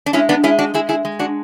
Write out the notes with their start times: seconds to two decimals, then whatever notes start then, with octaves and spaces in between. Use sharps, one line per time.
0.06 D4
0.13 G#3 C#4 E4
0.29 B3 D4
0.43 G#3 C#4 E4
0.59 D4 F#4
0.74 G#3 E4 G#4
0.89 E4 G#4
1.05 G#3
1.19 D4 F#4